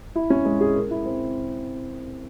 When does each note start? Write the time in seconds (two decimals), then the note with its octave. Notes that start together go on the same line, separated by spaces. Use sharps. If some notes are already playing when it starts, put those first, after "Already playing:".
0.15 E4
0.30 C#4
0.45 G#3
0.61 G#4
0.75 A#4
0.91 E4
1.05 C4